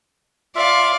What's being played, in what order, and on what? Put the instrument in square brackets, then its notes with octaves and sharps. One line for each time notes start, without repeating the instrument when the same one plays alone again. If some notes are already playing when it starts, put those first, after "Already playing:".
[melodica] F4 E5 [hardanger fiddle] D5 F5